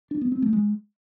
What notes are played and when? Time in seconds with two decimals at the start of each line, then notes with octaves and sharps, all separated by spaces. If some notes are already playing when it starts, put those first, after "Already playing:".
0.11 D4
0.21 B3
0.32 C4
0.42 A3
0.53 G#3